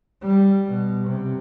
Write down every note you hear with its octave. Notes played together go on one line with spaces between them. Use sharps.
G3
B2
C3